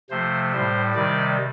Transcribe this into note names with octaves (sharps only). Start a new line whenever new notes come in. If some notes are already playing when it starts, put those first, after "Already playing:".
C3 F3 A3 C5
A2 G3 C5
C3 D#3 G3 D5